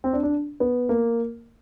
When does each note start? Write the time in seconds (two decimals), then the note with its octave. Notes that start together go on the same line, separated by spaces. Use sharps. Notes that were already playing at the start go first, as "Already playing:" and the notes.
0.04 C4
0.13 D4
0.23 D4
0.60 B3
0.89 A#3